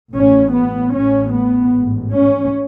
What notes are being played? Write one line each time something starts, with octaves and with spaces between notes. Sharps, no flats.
A1 A2 C#4
B3
A1 A2 C#4
B3
A1 G#2
C#4